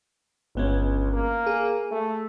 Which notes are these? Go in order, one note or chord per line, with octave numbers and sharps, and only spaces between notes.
G1 C#2 B3 C#4
A#3
G#4
A3